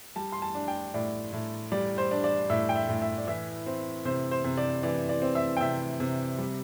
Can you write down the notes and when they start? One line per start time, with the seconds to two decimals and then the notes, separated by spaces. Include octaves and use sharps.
0.16 G3 A5
0.32 C6
0.42 A5
0.55 D4
0.68 G5
0.94 A2 D5
1.32 A2
1.72 G3 D5
1.98 C5
2.11 D4
2.24 D5
2.50 A2 E5
2.69 G5
2.76 E5
2.89 A2
3.02 E5
3.18 D5
3.27 E3 E5
3.66 C4
4.05 C3 C5
4.31 C5
4.44 C3
4.58 D5
4.83 E3 D5
5.09 D5
5.22 C4
5.35 E5
5.57 G5
5.61 C3 E5
6.00 C3
6.38 G3